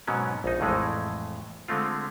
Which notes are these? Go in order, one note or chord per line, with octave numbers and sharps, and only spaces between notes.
G#2 B2 F#3 B3 C#4
A#1 D#4
F2 A2 E3 G#3 A3
D3 G#3 A3 C4 F4